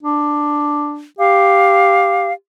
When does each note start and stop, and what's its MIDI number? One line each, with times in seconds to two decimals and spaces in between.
0.03 1.05 62
1.19 2.31 67
1.19 2.33 77